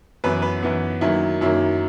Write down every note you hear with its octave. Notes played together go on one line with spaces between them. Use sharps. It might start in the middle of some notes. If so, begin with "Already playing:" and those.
F#2 E3 B3 B4
B4
F#2 E3 B3
F#2 D#3 F#3 A#3 E4
F#2 D#3 F#3 A#3 E4